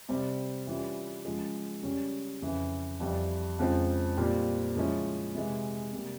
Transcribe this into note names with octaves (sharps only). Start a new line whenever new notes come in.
C3 G3 C4
E3 G3 C#4 F4
C#3 F3 G#3
C#3 G3 C#4
F2 C#3 E3
F2 E3 G3
F2 C#3 F3 G#3 C4
A#2 G3 C4 F4
C#3 F3 G#3 C#4 E4
C3 E3 G#3
C3 G3 A#3